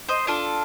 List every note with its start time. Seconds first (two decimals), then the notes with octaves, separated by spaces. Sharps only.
0.08 C5 D#5
0.27 D4 F4 A4